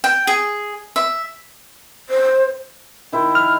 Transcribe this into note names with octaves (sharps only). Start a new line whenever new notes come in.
G5
G#4
E5
C5
D#3 E4 C5
F6